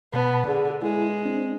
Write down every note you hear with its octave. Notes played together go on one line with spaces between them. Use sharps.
B2 B3 A5 B5
D3 G#4
G#3 E4
C4 D4